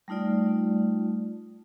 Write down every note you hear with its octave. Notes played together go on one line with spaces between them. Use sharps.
G3 A3 D#4 F4 D5